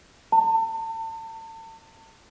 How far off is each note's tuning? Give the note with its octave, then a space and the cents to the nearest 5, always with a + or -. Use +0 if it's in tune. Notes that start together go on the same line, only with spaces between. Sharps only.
A5 +35